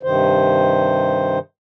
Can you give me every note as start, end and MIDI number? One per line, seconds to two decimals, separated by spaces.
0.03 1.39 43
0.03 1.39 48
0.03 1.39 51
0.03 1.39 72